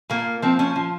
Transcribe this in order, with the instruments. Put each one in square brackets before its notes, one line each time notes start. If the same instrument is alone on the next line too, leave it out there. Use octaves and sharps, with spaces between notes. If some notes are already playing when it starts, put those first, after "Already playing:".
[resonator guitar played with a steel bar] A#2 A#3
F3 C4
C#4
F3